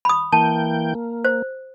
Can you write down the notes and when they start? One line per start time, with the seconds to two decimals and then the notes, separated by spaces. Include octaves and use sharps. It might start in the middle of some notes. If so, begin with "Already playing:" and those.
0.05 B5 D#6
0.33 E3 A#3 G5 A5
0.95 A#3
1.25 C5